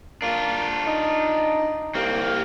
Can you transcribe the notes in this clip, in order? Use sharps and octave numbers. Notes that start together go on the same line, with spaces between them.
A#3 D4 F4
D#4
C2 A#3 C4